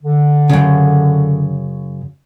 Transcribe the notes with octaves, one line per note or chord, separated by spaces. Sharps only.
D3
F#2 C#3